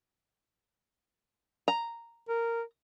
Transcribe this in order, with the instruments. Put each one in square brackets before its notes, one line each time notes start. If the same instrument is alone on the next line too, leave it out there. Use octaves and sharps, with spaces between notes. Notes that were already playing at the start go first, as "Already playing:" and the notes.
[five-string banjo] A#5
[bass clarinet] A#4